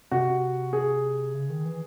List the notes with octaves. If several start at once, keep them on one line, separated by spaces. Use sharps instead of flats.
C3 F#4
G#4
C#3
D#3
E3